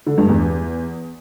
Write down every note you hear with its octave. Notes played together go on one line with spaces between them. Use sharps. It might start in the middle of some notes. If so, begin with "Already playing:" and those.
D3
G2
E2